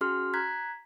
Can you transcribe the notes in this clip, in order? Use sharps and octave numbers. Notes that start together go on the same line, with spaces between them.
C#4 F#4 G#4 C6 F6
A#5 F#6 G#6 B6